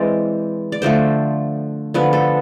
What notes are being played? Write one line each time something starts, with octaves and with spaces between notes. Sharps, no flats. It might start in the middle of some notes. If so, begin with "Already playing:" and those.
Already playing: E3 G#3 C4 D5
D5
D3 F3 A3 C5
D3 F3 B3 B4
A4